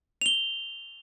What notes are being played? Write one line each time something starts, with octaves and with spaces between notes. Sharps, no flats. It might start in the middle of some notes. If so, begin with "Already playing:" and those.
F7 G7